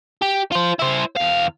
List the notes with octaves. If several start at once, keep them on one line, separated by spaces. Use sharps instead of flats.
G4
F4 C5
E4 C5
E2 F5